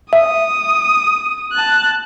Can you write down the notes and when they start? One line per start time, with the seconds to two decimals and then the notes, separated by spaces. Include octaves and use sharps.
0.13 E5 D#6
1.53 A5 F#6